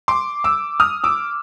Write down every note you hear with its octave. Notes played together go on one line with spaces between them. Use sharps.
C6 D6
D6 E6
D#6 F6
D6 E6